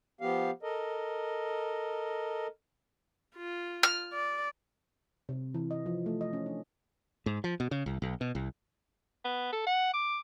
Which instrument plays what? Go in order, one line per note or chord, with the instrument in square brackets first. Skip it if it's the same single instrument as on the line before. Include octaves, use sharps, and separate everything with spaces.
[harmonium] F3 B3 G4 F5
A4 A#4 D#5
[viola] F4
[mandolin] F6
[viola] D5
[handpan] C3
E3
D#5
F3
A3
D#5
C#4
D4
[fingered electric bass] G#2
F3
B2
C#3
C2
B1
B2
C2
[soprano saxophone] B3
A4
F#5
D6